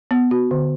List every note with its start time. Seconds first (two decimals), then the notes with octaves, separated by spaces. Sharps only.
0.11 B3
0.31 F#4
0.51 D3